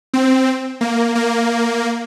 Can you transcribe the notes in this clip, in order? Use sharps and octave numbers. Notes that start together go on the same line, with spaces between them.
C4
A#3
A#3